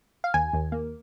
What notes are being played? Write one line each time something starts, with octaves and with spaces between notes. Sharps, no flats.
F5
D#2 G#5
D#2
A#3